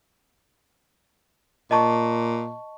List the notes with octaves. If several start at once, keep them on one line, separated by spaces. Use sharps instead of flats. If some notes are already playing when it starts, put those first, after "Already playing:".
A#2 D#5 A5 C#6